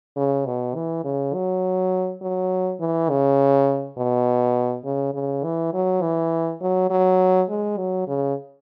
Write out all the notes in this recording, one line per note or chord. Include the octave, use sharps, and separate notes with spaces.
C#3
B2
E3
C#3
F#3
F#3
E3
C#3
B2
C#3
C#3
E3
F#3
E3
F#3
F#3
G#3
F#3
C#3